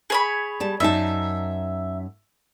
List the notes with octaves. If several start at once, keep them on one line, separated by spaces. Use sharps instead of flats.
G#4 C#5 B5
G3 A5
F#2 D#4 E5 A5